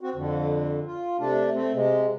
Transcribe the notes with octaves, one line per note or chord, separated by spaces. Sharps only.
C4 F#4
F2 D3
F4
C3 A3 D4
A3 C4
C3 G#3